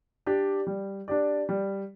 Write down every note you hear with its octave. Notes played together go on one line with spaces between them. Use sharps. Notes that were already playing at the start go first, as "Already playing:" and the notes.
D4 G4 D5
G3
D4 G4 D5
G3